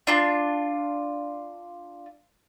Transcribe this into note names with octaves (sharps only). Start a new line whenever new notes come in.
D4 F4 A5